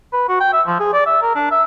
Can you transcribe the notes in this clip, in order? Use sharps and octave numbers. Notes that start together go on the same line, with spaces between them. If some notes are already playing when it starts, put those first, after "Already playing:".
B4
F#4
G5
E5
F3
G#4
D5
E5
A#4
D4
E5